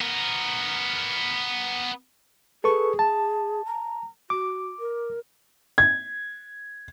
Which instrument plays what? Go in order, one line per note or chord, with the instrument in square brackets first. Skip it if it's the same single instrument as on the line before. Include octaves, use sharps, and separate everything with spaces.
[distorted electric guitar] B3 A#4
[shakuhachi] G#4 [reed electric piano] A4 B4 C#6
[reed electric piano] A5
[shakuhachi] A#5
[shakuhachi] F#4 [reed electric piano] D6
[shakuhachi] A#4
[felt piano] G#6